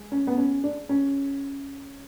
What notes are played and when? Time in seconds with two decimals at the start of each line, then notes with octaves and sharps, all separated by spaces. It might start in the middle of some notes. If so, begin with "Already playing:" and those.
Already playing: G#3
0.12 C#4
0.27 B3
0.38 C#4
0.64 D4
0.89 C#4